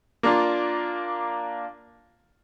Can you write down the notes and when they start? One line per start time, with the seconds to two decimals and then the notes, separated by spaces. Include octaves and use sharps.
0.23 A#3 D4 F4